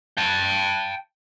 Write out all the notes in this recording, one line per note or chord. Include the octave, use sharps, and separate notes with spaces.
G5 A5